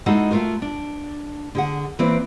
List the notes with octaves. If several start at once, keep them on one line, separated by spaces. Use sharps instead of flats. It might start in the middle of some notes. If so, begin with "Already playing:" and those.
G#3 D#4 E4 F#4 A4 F#5
A3 C4 F4 F#4 A#4
D4
D3 G#4 F#5
E3 A#3 C4 B4 D5